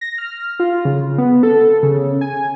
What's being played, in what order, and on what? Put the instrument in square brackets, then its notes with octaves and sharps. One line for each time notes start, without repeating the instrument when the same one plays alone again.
[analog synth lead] A#6
F6
F4
C#3
B3
A4
C#3
G#5